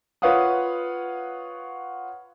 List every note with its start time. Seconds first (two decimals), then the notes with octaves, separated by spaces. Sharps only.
0.22 F4 B4 C#5 F5 F#5 D#6